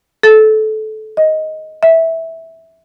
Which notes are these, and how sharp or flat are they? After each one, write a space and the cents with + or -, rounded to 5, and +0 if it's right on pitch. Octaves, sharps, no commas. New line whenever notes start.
A4 -20
D#5 +10
E5 -10